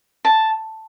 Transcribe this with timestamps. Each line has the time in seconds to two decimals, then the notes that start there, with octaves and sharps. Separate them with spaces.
0.25 A5